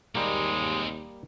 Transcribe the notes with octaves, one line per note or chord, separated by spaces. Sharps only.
D#2 G3 G#3 A#3 C4 D#4